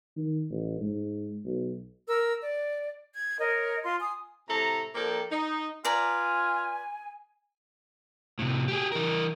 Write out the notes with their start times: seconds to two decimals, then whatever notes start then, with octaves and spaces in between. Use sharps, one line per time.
0.16 D#3
0.50 A1
0.80 G#2
1.45 B1
2.07 A#4 E6
2.40 D5
3.14 G#6
3.39 A#4 C#5 D#5
3.82 F4 C6
3.99 G#5 D#6
4.48 A2 C3 A3 A4 A#5
4.95 F3 A#3 D4 A4 G5 A#5
5.31 D#4
5.85 F4 B4 D5 G#5 A#5
8.39 A2 C3
8.68 G4 G#4
8.92 E3 A#4